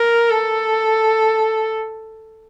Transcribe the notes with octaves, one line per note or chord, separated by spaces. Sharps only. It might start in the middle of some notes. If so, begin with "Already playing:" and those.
Already playing: A#4
A4